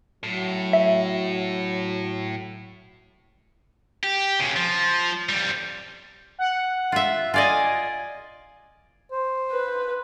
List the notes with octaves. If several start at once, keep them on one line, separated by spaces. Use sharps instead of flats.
A2 F#3
E5
G4
B1 C#3
F3
F2 G3
F#5
F4 E5
F4 D5 D#5 G#5
C5
B4